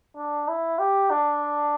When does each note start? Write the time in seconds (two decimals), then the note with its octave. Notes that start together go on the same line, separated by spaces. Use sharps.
0.17 D4
0.48 E4
0.79 G4
1.11 D4